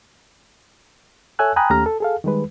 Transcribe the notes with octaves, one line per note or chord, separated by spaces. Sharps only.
A4 C#5 E5 G#5 E6 F#6
G5 G#5 A#5 B5 D#6 F#6
D#2 A3 C#4 G4 A#5 F6
A4
G#4 A4 F5
D#3 G3 G#3 B4